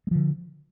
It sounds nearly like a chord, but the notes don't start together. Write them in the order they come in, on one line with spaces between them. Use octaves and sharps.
G#3 F3 D3